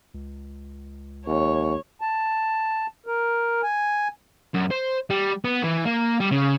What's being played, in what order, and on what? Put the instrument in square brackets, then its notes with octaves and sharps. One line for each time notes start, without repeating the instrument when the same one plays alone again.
[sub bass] C#2
[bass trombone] D#2 [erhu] C#5
[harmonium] A5
A#4
G#5
[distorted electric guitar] F#2
C5
G3
B3
E3
A#3
G3
C#3